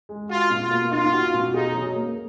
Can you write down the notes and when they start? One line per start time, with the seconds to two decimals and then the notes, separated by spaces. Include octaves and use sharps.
0.09 G#3
0.30 F4 F#4
0.50 B2
0.61 F4
0.71 A#3
0.91 D#4 F4
1.13 F#4
1.34 B2
1.54 D#4 G#4
1.74 F#3
1.95 A#3